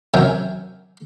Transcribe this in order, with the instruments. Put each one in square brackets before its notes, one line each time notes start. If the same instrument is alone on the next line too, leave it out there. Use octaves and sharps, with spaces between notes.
[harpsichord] C3 F#3 C#4 A#4 E5 G5